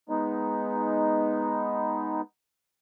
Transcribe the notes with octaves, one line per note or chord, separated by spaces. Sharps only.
G#3 B3 D#4